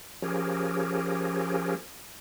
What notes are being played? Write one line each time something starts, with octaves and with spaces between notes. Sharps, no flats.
F3 C#4 G4 G#4 A#4